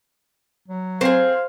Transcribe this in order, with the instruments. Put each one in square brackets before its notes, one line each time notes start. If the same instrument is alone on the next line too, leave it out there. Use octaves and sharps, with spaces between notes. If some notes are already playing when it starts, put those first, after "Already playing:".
[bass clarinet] F#3
[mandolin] C4 G#4 [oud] C5 [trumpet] F5